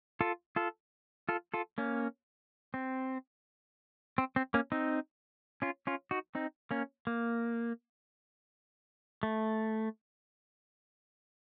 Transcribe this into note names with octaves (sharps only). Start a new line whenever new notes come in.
F4 A4
F4 A4
F4 A4
F4 A4
A#3 C#4
C4
C4
C4
A#3 C#4
C4 D#4
C#4 F4
C#4 F4
D#4 F#4
C4 D#4
A#3 C#4
A#3
A3